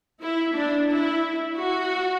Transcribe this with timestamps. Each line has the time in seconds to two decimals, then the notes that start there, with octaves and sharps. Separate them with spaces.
0.23 E4
0.56 D4
0.90 E4
1.56 F#4